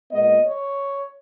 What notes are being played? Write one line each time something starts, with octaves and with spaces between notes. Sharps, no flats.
A#2 G#3 B3 D#5
C#5